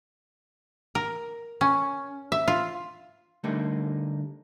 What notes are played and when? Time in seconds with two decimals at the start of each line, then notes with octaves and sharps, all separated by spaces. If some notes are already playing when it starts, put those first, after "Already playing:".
0.95 A#4
1.61 C#4
2.32 E5
2.48 F4
3.44 D3 G3 A3 A#3 D4 D#4